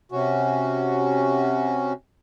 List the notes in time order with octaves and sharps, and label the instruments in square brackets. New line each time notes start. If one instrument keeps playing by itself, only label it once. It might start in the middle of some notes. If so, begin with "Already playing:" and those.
[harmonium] C3 C#4 F#4